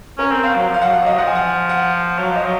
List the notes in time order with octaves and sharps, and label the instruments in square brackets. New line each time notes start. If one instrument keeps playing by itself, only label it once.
[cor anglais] C#4 [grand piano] A#4
[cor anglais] C4
[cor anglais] C4 [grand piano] F5
[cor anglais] F#3
F3
[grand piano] F5
[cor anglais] F#3 [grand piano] F#5
[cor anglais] F3 [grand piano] F5
[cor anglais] F#3
[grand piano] D#5
[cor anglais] F#3
[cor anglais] F3 [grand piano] F#5
[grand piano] G#5
F#5
F#5
[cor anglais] F#3 [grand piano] F5
[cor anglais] F3 [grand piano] D#5
[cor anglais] F#3